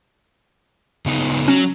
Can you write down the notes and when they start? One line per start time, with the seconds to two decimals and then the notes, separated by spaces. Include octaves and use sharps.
1.06 C#3 B3 D#4
1.48 F#3 C#4